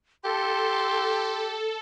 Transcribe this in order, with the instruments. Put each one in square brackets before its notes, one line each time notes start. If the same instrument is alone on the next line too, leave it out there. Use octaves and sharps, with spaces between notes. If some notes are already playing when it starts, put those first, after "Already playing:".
[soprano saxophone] G4 [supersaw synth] A4 [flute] C6